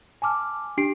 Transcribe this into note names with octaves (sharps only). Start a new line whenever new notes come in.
G#5 A5 D6 F6
D4 G4 C7 D7